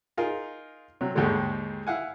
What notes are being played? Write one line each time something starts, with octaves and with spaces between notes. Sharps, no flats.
D#4 F4 G#4 A#4
C3 F#3
D#2 G#2 D3 D#3 G3 G#3
E4 F5 F#5 G#5